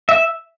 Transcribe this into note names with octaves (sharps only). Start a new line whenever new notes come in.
E5